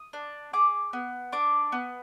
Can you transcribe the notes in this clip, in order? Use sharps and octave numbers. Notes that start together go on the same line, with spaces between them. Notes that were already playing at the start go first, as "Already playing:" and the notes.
Already playing: D#6
D4
G#4 D6
B3
D4 D6
B3